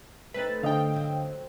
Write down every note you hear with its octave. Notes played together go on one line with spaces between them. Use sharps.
A3 C4 D#4 B4 A6
D3 D#5 F5 G5
F#3 C4